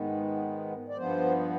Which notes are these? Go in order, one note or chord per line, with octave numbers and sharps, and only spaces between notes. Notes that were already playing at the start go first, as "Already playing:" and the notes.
Already playing: G#2 D#3 G#3 B3
D5
G2 F3 B3 C5